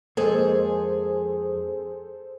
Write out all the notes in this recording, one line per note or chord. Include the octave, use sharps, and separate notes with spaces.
F2 G#3 A#3 G#4 A4 C5